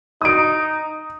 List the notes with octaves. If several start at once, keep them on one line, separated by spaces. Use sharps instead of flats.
D#4 D#6 D7